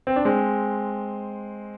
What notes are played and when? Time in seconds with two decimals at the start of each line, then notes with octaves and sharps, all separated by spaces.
0.07 C4
0.16 D4
0.25 G#3 C4